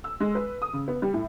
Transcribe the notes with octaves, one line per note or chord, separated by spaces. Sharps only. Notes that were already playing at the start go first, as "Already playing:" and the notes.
E6
G#3
B4
D#6
C#3
B3
G3
A2